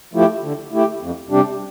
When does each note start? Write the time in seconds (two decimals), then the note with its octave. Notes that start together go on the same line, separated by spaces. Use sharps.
0.14 F3 A3 E4 G4
0.43 D3
0.72 A3 E4 G4
1.01 F2
1.30 C3 G3 D4 G4